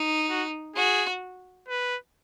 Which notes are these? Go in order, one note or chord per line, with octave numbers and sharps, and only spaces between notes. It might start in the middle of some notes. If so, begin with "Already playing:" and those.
Already playing: D#4
F#4
F#4 G#4
B4